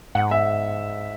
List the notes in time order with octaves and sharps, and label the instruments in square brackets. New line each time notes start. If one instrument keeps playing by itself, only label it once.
[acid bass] G#2 [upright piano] F#5
[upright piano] E5